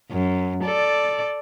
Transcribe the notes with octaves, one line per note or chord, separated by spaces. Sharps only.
F#2
A4 D5